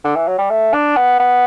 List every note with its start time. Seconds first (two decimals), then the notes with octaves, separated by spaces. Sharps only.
0.05 D3
0.16 E3
0.28 F#3
0.39 G3
0.50 A3
0.73 D4
0.97 B3
1.20 B3